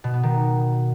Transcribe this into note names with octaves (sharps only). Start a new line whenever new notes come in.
B2
B3
D#3